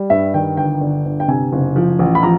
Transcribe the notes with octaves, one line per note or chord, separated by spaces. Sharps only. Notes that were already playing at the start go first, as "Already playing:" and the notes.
Already playing: G3
G2 E5
D#3 G5
G1 G5
D3
G1
G5
C3 G#5
F#1
F3
A1
B5
F3 A#5